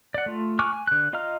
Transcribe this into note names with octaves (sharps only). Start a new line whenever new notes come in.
D5 F#5
A3 F4
G#5 C#6 D6 F6 F#6
G#5
D3 F#6
F4 D#5 F5 A#5 F6